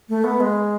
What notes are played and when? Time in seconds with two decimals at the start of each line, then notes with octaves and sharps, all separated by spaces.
0.09 A3
0.24 B3
0.40 G#3